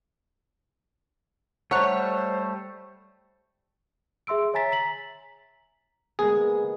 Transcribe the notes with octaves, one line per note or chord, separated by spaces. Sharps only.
G3 A3 C5 C#5 F#5 A#5 F#6
G#4 E5 C6 E6 D7
C#5 E5 G#5 A#5 A6 B6
A#5 B6 F#7
G#3 A#3 B3 G#4